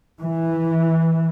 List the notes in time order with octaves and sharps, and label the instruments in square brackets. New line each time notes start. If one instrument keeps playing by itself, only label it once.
[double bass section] E3